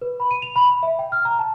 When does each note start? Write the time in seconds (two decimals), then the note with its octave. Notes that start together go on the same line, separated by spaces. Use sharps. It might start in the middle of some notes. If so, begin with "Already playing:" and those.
0.02 B4
0.20 B5
0.31 D#7
0.42 F7
0.56 B5
0.70 B5
0.83 E5
0.99 G5
1.12 F6
1.25 A#5
1.39 A5